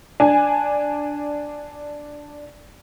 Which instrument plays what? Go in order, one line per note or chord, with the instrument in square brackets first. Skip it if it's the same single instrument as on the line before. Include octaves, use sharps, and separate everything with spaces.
[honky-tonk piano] D4 G#5